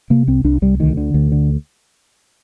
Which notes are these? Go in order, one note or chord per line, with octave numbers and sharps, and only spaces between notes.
C3 A#3
C2 C4
C2 D4
C2 G3
D2 D#3
D3
D2
D3